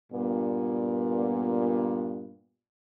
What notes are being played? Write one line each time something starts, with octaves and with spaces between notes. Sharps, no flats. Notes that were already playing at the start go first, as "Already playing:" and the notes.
G2 A#2 B3